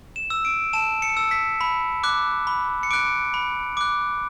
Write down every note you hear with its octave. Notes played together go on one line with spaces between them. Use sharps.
E7
E6
D7
A5 E7
C#7
E6
B6
B5
D6 F#6
B5
C#7
D6 F#6 D7
B5
D6 F#6